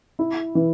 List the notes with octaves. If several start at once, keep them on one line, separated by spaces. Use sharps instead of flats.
E4
E3